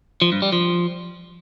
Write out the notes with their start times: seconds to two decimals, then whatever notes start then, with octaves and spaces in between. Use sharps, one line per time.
0.22 F3
0.32 G2
0.42 G3
0.52 F3